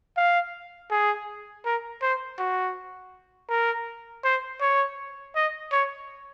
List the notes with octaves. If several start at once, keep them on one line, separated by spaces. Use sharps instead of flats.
F5
G#4
A#4
C5
F#4
A#4
C5
C#5
D#5
C#5